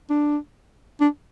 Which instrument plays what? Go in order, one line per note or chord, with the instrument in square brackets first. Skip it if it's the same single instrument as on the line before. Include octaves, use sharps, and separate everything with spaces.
[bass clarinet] D4
D4